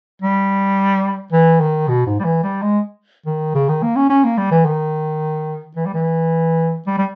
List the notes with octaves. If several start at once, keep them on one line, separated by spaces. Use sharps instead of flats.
G3
E3
D#3
B2
G#2
G3
E3
G3
G#3
D#3
C#3
D#3
A#3
C#4
C#4
A#3
G3
E3
D#3
E3
G3
E3
G3
G3